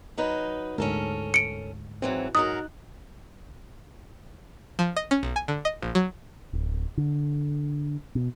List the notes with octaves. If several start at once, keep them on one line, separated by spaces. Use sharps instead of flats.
F#3 D#4 B4
D2 G#2 C#4 A4 A#4
C#7 D7
G#2 E3 F#3 C4
G#2 F#3 D#4 A#4 D#6 F#6
F3
D#5
C#4
B1
G#5
D3
D#5
A#1
F#3
D1
D3
B2